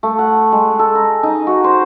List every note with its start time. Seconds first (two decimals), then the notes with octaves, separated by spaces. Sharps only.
0.03 A3
0.19 F#5
0.52 G#3
0.79 A4
0.95 A#5
1.23 D#4
1.47 F#4
1.64 C5